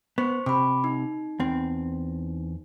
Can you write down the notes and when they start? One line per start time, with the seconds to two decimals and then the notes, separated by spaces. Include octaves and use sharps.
0.18 B3 C5 C#6
0.46 C3 B5 D6
0.84 D#4
1.40 E2 C4